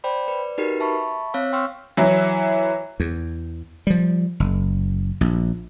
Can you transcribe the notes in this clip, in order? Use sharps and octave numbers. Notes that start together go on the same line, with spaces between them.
C5 D5 G5 B5
B4 D5
D#4 F#4 G4 A#4 B4
E5 A5 B5 C#6
C4 C#5 F5 E6 B6
G5 C6 C#6 E6 F6
E3 F#3 E4
E2
F3 G3
F#1
A#1